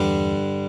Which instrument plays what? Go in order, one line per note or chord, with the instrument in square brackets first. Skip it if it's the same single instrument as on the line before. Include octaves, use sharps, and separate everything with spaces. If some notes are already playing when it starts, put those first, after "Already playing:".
Already playing: [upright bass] E2 [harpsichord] G2 D3 G3